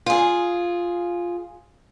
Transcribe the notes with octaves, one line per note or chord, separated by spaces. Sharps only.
F4 G#4